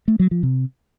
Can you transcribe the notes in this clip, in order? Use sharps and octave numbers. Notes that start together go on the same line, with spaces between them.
A3
F#3
F3
C3